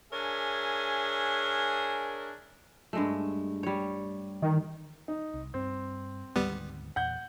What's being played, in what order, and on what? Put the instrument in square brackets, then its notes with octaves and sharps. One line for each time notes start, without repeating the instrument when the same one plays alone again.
[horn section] D4 G#4 A#4 C#5 E5 G#5
[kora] G2 G#3 A3
G3 C#5
[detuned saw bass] D#3
[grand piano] D#4
[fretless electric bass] C2
[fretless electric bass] G2 [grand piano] C4
[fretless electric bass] D2 G#2 D#3 [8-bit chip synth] G3 B3
[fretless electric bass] E2 A#2 [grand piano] F#5 G6